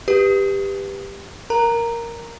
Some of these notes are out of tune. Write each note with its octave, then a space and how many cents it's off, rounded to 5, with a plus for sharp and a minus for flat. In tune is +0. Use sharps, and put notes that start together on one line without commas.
G4 +15 B4 +0
A#4 +0 A#5 -5